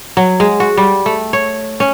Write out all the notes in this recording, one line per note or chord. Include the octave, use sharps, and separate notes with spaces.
F#3
G#3
F#4
G3
A3
C#5
C#4